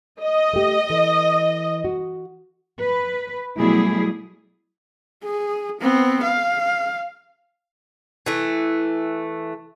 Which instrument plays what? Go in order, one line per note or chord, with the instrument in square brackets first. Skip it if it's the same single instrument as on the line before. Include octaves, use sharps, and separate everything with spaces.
[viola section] D#5
[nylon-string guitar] A3 G4
E3 A4
F#4
[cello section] B4
B2 F#3 G3 A3 E4 G#4
[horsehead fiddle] G#4
B3 C4
F5
[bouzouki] E3 A3